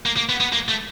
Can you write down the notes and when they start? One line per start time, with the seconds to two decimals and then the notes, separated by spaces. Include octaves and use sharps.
0.06 A#3
0.17 A#3
0.29 B3
0.41 B3
0.53 A#3
0.69 A3